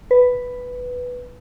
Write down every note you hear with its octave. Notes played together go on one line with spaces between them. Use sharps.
B4